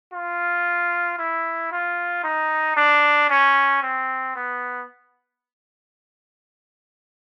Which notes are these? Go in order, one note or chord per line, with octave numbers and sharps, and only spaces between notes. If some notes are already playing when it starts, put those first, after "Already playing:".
F4
E4
F4
D#4
D4
C#4
C4
B3